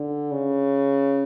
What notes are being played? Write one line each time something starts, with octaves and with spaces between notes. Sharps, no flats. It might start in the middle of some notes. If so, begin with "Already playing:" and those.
Already playing: D3
C#3